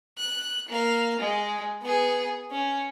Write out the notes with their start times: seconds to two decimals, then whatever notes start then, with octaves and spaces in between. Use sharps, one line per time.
0.18 F#6
0.68 A#3 F5
1.19 G#3
1.82 B3 G#4
2.51 C#4